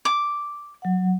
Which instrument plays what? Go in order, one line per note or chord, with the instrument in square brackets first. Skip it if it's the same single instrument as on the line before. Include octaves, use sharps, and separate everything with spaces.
[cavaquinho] D6
[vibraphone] F#3 F#5